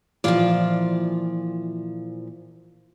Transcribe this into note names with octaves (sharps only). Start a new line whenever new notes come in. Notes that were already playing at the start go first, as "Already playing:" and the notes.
A#2 E3 F3 F4 D5